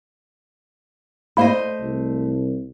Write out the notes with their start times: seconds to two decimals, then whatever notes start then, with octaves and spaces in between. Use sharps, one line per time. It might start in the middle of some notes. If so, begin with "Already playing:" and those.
1.37 A3 A#3 E4 C5 D#5
1.81 C2